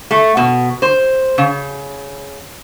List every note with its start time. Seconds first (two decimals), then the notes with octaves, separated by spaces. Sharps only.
0.11 A3
0.37 B2
0.82 C5
1.38 C#3